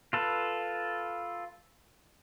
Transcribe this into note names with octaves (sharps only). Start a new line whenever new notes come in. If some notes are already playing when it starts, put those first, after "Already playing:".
F4 A4 B4